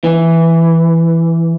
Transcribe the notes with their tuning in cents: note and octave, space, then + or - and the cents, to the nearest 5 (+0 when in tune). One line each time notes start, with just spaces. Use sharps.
E3 +5